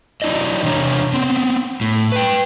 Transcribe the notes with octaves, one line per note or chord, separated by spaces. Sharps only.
F#3 D#4 E4 D5 D#5
E2 C3 D4 C#5 A#5
B3 C4
A2
B4 G5